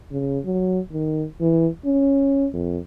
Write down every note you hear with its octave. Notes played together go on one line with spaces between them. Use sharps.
C#3
F#3
D#3
E3
C#4
F2